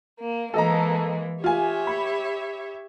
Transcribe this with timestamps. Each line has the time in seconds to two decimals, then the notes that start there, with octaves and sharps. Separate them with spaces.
0.21 A#3
0.54 E3 G#3 A#3 A4 D#5 A#5
1.44 F4 G4 C#5 E5 G#5
1.87 B5